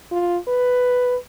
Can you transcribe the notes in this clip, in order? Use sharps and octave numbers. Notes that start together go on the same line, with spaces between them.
F4
B4